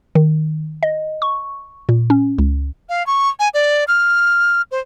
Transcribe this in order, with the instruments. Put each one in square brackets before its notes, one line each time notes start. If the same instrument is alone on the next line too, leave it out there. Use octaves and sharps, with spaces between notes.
[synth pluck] D#3
D#5
C#6
A#2
C#4
C#2
[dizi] F5
C#6
G#5
D5
F6
C5